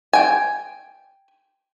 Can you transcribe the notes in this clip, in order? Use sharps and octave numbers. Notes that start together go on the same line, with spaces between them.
G5 G#5